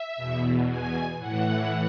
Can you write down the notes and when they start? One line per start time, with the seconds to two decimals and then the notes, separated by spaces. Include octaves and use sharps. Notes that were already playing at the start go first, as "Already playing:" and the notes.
Already playing: E5
0.16 E2 B2
0.67 G#5
1.18 A2 E3 F#5